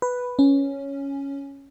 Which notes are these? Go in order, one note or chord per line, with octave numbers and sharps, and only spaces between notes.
B4
C#4